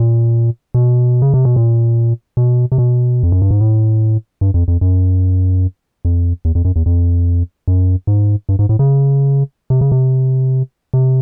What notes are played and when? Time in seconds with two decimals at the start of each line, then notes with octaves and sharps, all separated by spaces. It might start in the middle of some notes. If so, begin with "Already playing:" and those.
Already playing: A#2
0.75 B2
1.22 C#3
1.34 C3
1.45 B2
1.56 A#2
2.37 B2
2.72 C3
2.78 B2
3.23 F2
3.32 F#2
3.42 G2
3.51 G#2
3.60 A2
4.41 G2
4.54 F2
4.68 F2
4.81 F#2
6.05 F2
6.45 E2
6.55 F2
6.65 F#2
6.76 E2
6.86 F2
7.68 F#2
8.07 G#2
8.49 G2
8.59 G#2
8.69 A2
8.79 C#3
9.70 C3
9.81 C#3
9.92 C3
10.94 C3